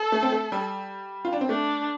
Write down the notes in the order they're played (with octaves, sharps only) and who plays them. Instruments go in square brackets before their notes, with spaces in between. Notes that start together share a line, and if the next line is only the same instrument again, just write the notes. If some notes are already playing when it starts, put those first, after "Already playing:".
Already playing: [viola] A4
[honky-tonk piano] A3
C4
A3
G3
F4
D4
C4
[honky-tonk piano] A3 [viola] D4